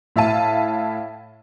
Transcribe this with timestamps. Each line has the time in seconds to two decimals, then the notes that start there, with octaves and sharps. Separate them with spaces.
0.16 A2 E5 F5 A5 D#7